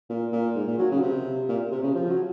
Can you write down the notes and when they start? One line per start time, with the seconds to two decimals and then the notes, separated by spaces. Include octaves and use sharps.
0.09 A#2
0.32 A#2
0.55 G#2
0.67 A#2
0.78 F#3
0.91 C#3
1.01 C3
1.49 A#2
1.72 C3
1.83 C#3
1.95 F3
2.10 F#3